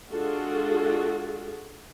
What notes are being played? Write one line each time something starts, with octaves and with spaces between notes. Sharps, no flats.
G#3 D4 F4 F#4 G#4 A4